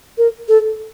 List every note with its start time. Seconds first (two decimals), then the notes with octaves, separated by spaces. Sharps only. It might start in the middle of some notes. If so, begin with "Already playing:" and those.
0.18 A#4
0.49 A4